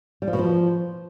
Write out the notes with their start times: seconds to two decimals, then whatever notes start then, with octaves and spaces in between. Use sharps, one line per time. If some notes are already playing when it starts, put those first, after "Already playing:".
0.22 G3
0.27 F3
0.33 B2
0.39 F3